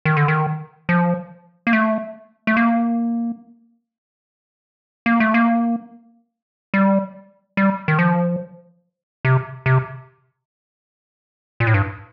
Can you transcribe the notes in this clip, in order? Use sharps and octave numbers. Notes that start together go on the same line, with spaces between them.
D#3
D3
D#3
F3
A#3
A3
A3
A#3
A#3
A3
A#3
G3
G3
D#3
F3
C3
C3
A#2
A2
G2